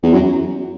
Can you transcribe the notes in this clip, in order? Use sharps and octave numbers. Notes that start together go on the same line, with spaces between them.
E2
F#2